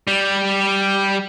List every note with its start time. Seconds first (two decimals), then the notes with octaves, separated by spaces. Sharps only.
0.07 G3